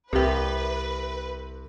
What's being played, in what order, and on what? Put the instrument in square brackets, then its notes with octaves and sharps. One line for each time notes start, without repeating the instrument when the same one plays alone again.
[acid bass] C2 [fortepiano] C3 G4 [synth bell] A#4 E5 [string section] B4